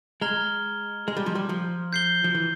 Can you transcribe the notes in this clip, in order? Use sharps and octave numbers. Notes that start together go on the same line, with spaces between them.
G#3 A#5 F6 G#6 E7 G7
G#3
G3
F3
G3
F3
G6 C7 G7
F3
E3